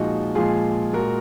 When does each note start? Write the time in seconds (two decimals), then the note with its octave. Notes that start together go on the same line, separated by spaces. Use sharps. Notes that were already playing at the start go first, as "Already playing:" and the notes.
Already playing: A#2 F3 G#3 D#4 F#4
0.35 A#2 F3 G#3 F4 G#4
0.93 A#2 G#3 F#4 A#4